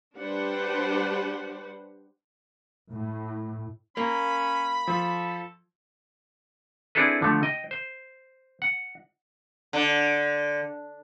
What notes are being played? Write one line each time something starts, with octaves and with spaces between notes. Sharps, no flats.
G3 D4 G4 B4 C5 F#5
A2
A#3 C#4 B5
F3 A4
C4 D4 E4 G#4 A4 B4
D3 F3 A3
D#5 G5
C5
F#5
D3